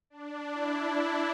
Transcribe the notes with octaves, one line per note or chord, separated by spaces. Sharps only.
D4
E4